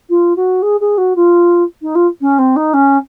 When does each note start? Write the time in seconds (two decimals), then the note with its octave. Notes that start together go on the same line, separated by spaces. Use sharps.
0.09 F4
0.36 F#4
0.62 G#4
0.80 G#4
0.98 F#4
1.16 F4
1.82 D#4
1.95 F4
2.21 C#4
2.38 C4
2.56 D#4
2.73 C#4